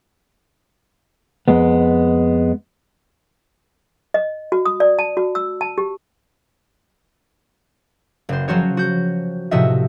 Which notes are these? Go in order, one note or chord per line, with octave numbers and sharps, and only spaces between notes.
F2 G#3 B3
D#5
F#4
D#6
D5
A5
F#4
E6
A5
G4
F#1 C5
F3 F#3 F#4 C5 C#5
F#4 G6
A2 C3 F3 F#4 D#5 E5